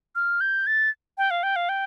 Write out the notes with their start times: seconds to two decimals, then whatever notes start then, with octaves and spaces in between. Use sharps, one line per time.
0.16 F6
0.41 G6
0.67 A6
1.18 G5
1.31 F5
1.43 G5
1.56 F5
1.69 G5